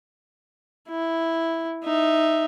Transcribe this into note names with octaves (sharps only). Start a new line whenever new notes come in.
E4
D#4 E5